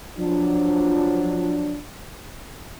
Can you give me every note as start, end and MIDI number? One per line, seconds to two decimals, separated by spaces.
0.18 1.77 53
0.18 1.77 54
0.18 1.77 62